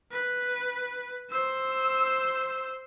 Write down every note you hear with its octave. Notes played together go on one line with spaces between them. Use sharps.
B4
C5 E6